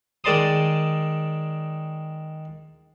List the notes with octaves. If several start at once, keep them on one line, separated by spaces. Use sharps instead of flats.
D#3 G#3 D5 A5 C6 D#6